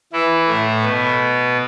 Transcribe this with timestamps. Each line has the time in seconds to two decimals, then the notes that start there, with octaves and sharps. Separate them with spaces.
0.13 E3 E4
0.48 A2 A3
0.83 B2 B3